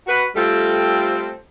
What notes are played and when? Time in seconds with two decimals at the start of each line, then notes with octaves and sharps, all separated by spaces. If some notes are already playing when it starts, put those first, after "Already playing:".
0.07 F#4 B4
0.36 G3 A3 C4 F4 A4